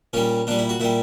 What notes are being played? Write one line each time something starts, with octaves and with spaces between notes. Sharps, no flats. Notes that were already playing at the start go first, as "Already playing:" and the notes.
A#2 G3 C#4
A#2 G3 D4
E4
F#4
A#2 G3 E4